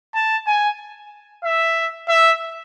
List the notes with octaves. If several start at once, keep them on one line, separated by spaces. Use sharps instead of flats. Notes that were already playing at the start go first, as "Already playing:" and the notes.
A5
G#5
E5
E5